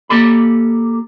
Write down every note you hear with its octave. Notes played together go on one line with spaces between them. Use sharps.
A#3 G4 A4 B5